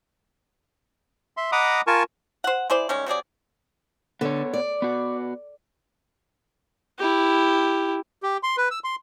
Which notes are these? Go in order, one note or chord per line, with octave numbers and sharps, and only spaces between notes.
E5 C6
D#5 F#5 A#5 B5 D6 D#6
F4 A#4 G#5 A5 C#6
C5 F#5
E4 G#4 C5 D5
D#3 G3 G#3 C#4
C3 F#3 G#4 D5
D3 B3 C#5
D5
B3 F#4
E4 G4
G4
C6
B4
E6
C6